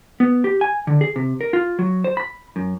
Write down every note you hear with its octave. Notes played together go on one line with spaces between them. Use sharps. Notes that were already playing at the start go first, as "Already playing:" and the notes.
B3
G4
G#5
D3
G#4
C3
A#4
F4
F#3
C5
B5
F#2